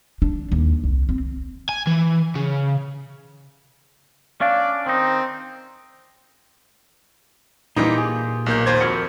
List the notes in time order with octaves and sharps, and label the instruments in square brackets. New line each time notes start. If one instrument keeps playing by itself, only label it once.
[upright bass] D4
D#2
C2
C4
[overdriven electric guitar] G#5
E3
C#3
[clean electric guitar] C#4 D4 [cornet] D5 [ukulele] F5
[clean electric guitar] D#3 D#4 [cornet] C4
[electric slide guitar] A#2 F4 G4 [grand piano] E3 G3 D#4
[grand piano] G#4
[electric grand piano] B1 A#3 G6
D#2 C5 G#6
[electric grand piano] F2 [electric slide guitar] F#4 A#4 F#5